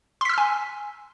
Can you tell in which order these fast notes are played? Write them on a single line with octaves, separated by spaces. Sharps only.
C6 B6 E6 F6 G#5